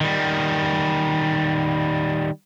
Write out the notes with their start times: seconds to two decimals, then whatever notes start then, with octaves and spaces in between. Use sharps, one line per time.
0.01 D#3 G3